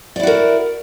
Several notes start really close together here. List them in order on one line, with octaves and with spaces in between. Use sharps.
D5 E4 F#4 A#4